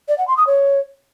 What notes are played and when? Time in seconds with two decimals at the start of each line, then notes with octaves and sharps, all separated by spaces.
0.08 D5
0.18 F#5
0.28 C6
0.37 D#6
0.47 C#5